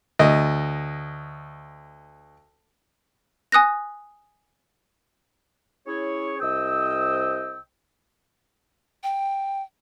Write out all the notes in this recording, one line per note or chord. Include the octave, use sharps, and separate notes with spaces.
D2 D#5
G#5 D#6 F#6 A#6
C#4 E4 G#4 C#5
C2 C5 D#5 G5 D#6 E6
G5